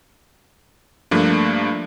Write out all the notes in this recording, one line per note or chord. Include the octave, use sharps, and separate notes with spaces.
G2 F3 A3 A#3 D4